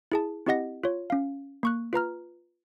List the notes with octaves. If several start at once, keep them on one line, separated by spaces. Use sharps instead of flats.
E4 G#4 A5
C4 E4 G4 D#5 F#5 A#6
F4 C#5
C#4 F5
A#3 C#6 F#6
F4 B4 A#5 F6